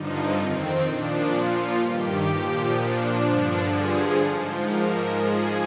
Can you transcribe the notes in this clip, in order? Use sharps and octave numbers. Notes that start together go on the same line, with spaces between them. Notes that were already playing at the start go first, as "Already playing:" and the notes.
Already playing: G2 D3 F3 D#4
F2 D#3 C4
A#2 F3 D4
A#2 F3 F4
G2 D#3 G4
A#2 F3 G4
A#2 F3 D4
G2 D3 F3 D4
G2 D3 F3 G#4
G#2 F3
G#2 F3 A#4
G#2 F3 G#4